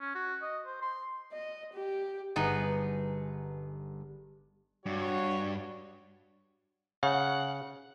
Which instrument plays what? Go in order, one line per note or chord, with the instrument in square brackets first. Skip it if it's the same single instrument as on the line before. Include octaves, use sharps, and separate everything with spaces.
[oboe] C#4
F#4
D#5
C5
C6
[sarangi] D#5
G4
[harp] G1 [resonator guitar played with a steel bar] B3 D#4 G#4
[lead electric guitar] G2 [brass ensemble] F#4 C#5
[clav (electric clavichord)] C#3 [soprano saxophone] F#5